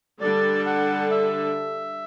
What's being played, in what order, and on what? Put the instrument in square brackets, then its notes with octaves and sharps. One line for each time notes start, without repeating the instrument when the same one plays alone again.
[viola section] D3 G3 D4 A4 [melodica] D5
[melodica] F#5
E5